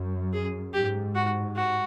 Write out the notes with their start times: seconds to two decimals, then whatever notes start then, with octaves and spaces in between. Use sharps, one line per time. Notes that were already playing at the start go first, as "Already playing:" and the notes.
Already playing: F#2
0.33 G#4
0.73 G#2 G4
1.15 F#4
1.56 F#4